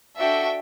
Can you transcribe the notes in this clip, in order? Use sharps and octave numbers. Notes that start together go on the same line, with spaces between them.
D4 F#4 A4 E5 G5